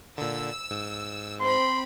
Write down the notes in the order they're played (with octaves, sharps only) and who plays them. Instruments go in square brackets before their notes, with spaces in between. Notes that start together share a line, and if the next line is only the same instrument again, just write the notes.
[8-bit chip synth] A#2 D3 [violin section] E6
[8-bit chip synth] G#2
[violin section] C4 B5 [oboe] C6